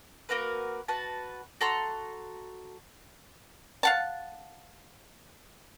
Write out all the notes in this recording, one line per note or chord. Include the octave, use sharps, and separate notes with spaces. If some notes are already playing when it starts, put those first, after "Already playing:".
A#3 F#4 A#4 B4
F#4 B4 A5
F#4 A4 A#5 C6
F5 F#5 A5